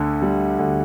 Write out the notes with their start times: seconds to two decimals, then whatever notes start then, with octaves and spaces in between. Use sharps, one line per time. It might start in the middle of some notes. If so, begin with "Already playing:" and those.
Already playing: D2 D3
0.22 G3
0.59 D2